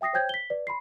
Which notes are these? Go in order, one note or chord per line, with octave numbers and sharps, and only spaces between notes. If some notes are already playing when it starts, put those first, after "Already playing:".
E5 G5 D#6 A#6 C7
C5 C#5 G5 G6 G#6
B6 G7
B4 D5
B5 C6 C7